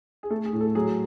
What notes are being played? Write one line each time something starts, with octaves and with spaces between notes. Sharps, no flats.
G#4
A3 A4
G#4
A2
A4
F#3 G#4